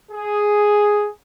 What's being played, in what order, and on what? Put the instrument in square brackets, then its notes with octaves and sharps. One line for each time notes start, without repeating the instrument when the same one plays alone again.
[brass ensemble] G#4